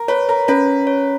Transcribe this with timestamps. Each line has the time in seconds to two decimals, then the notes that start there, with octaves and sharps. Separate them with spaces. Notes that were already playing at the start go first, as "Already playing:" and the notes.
Already playing: A#4
0.08 B4 C#5
0.29 A#4
0.48 C#4 B4
0.87 C#5